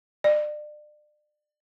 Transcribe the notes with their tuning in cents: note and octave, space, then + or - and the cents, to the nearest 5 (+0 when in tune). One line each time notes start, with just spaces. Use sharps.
D5 +35